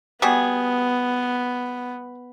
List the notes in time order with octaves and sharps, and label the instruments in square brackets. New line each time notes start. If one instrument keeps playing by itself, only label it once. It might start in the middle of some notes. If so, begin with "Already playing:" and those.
[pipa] G3 F#4 G#4 [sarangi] B3